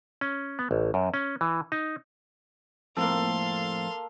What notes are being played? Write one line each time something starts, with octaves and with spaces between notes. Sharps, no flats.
C#4
B3
A1
F#2
C#4
E3
D#4
F2 A2 A#3 C4 A4 F5 C6